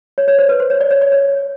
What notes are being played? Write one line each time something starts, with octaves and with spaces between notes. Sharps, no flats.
C#5
C#5
C5
B4
C5
C#5
D5
C#5
D5
C#5